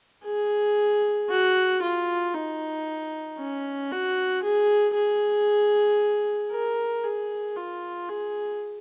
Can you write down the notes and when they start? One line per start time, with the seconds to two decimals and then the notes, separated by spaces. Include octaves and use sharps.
0.25 G#4
1.30 F#4
1.82 F4
2.34 D#4
3.38 C#4
3.91 F#4
4.43 G#4
4.95 G#4
6.51 A#4
7.04 G#4
7.56 F4
8.09 G#4